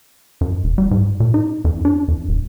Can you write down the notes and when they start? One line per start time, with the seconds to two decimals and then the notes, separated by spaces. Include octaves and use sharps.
0.41 F#2
0.64 E1
0.78 G3
0.91 G#2
1.20 A#2
1.34 D#4
1.65 F2
1.85 D4
2.08 F2
2.29 D#1